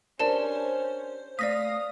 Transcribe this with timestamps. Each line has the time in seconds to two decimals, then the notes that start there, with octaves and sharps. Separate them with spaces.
0.19 C#4 D4 G4 A#4 C5 D5 A5 E7
1.39 A3 C4 D5 F5 D#6 A#6 B6